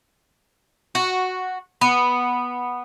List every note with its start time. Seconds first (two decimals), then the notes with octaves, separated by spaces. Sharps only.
0.95 F#4
1.81 B3